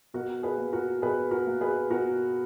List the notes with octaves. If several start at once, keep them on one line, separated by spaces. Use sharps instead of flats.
B2 F#4 A#4
G#4 B4
A#3
F#4 A#4
B2 G#4 B4
F#4 A#4
A#3
G#4 B4
B2 F#4 A#4